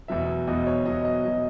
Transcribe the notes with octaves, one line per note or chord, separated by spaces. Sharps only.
E2 B2 F#3 E5
E2 B2 F#3 D#5
C#5
E2 B2 F#3 D#5
D#5
B2 F#3 D#5